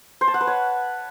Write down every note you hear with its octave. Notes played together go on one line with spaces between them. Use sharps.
C5
A5
F#5
B4
C#5